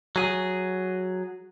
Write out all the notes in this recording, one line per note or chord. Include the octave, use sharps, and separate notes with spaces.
F#3 G#4